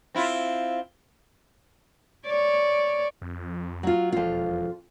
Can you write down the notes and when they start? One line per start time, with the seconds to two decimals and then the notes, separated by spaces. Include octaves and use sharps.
0.15 C4 E4 F4
2.26 C#5 D5
3.22 F2
3.83 F#3 F4
4.12 E1 F2 F4